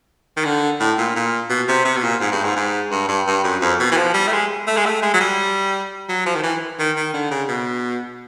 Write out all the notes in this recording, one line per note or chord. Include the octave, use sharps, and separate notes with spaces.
D#3
D3
A2
A#2
A#2
B2
C3
C3
B2
A#2
G#2
G2
G#2
G#2
G2
G2
G2
F#2
F2
B2
E3
F3
G3
A3
G#3
A3
G#3
A3
G#3
F#3
G3
F#3
F3
D#3
E3
D#3
D#3
D3
C#3
B2